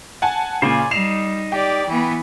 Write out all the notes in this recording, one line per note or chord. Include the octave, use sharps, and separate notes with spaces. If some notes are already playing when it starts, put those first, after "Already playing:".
F#5 G#5 A5
A#2 C#3 C5 D5 G#5
G3 D#4 C7 E7 F7
G4 D5 G5
E3 B3